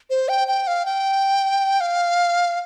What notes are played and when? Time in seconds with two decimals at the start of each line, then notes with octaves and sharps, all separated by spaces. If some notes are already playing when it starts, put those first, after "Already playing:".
0.10 C5
0.29 G5
0.48 G5
0.67 F5
0.86 G5
1.81 F5